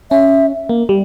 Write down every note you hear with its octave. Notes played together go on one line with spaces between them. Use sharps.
C#4 E5
A#3
G3